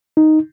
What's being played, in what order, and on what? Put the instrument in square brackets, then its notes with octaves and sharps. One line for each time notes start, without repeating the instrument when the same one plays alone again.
[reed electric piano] D#4